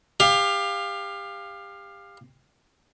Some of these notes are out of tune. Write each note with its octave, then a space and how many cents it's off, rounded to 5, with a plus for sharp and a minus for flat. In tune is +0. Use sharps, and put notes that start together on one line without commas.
G4 +30 F5 +0